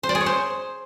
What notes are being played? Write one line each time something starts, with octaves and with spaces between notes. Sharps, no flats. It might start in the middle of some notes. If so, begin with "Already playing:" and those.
C5
D5
G#4
C#5
C5